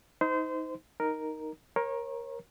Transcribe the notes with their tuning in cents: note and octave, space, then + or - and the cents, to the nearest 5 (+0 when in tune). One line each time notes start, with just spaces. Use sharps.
D#4 +25 C5 -25
D#4 +0 A#4 +0
A#4 +15 C#5 -30